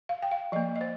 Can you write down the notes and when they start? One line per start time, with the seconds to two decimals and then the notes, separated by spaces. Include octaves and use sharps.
0.09 F5
0.22 G5
0.31 F5
0.52 F3 A#3 D#5
0.76 D#5
0.81 C5